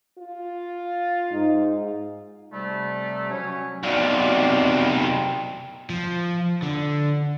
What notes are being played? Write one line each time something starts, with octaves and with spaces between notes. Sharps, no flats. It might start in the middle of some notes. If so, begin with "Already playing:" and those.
F4
G#2 D#4
C3 G3 A3
F#3 C#4 C#5
B1 C3 F#4 D5 F5
F3
D3